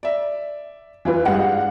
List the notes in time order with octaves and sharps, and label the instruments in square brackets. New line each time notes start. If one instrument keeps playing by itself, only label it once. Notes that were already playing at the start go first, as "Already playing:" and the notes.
[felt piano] D5 E5
[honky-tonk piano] E2 F4 B4 [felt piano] E3
[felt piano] G2 G3 G#3 [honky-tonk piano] F5 F#5